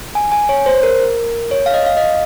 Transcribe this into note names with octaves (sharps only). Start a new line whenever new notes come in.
G#5
G#5
C#5
C5
A#4
C#5
F5
D#5
F5
D#5